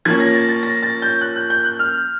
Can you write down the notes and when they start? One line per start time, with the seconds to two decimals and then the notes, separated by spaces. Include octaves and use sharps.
0.05 F3 A#3 C#4 G#6
0.20 A#6
0.34 A6
0.49 A6
0.63 A#6
0.83 A6
1.02 G6
1.21 F#6
1.36 F#6
1.50 G6
1.64 F#6
1.79 F6